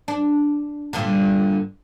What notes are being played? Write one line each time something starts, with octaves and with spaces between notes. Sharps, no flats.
D4
G2 A#2 D3